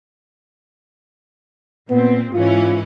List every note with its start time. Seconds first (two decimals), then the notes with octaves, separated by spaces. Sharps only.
1.90 A#2 B3 C4
2.33 G#2 E3 C#4 F4